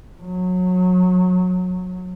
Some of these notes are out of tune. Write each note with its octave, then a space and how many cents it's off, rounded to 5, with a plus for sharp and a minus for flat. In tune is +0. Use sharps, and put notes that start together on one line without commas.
F#3 -25